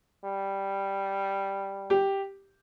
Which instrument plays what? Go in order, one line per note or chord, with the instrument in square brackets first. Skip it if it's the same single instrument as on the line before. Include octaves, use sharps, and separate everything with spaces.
[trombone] G3
[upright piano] G4